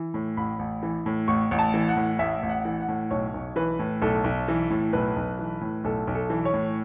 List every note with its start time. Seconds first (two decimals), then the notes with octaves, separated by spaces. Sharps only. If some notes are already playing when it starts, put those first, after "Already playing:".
Already playing: E3
0.14 A2
0.37 A1 B5
0.59 A1
0.83 E3
1.06 A2
1.28 A1 C#6
1.51 A1
1.59 A5
1.74 E3
1.89 F#5
1.96 A2
2.19 A1 E5
2.43 A1
2.49 F#5
2.65 E3
2.80 F#5
2.89 A2
3.11 B1 C#5
3.34 B1
3.56 E3 B4
3.79 A2
4.02 B1 A4
4.24 B1
4.48 E3
4.70 A2
4.93 B1 B4
5.16 B1
5.39 E3
5.61 A2
5.84 B1 A4
6.07 B1
6.15 A4
6.30 E3
6.45 C#5
6.54 A2